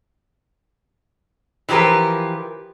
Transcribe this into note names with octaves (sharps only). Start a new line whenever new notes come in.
E3 F3 G4 A#4 B4